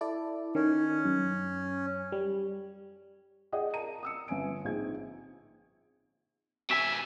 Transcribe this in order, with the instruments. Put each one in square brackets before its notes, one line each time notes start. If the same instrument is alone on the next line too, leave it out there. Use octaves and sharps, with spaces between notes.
[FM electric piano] E4 A4 D5
[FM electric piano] D#3 [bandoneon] C#4
[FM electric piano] F#2
G3
[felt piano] G#4 D5 D#5 F#5 G5 D#6
A#4 A5 A#5 D#7
D#6 E6 C#7
G1 C#4 G#5 D7
A#1 C4 D#4 G#4 G#6
[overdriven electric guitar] B2 G#5 [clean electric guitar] E5